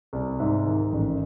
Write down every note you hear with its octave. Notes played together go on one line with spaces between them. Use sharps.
C2
G#2 E5
D#3
A1